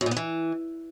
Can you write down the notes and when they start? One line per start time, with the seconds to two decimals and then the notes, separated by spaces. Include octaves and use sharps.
0.01 F#2
0.06 A#2
0.11 B3
0.17 E3